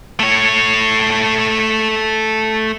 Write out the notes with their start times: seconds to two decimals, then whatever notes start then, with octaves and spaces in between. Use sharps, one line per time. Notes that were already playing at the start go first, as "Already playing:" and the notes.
0.19 A3 C#5